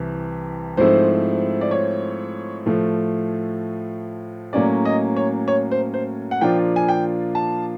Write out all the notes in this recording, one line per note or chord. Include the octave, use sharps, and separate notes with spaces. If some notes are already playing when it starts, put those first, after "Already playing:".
Already playing: C2 C3 E3
G#2 F3 A3 C4 E4 C5
D5
C#5
A2 F3 A3
A2 F#3 A#3 C#4 D5
D#5
C#5
C#5
C5
C5
F#5
A#2 F3 A#3 D4 F4 G5
G#5
G5
A5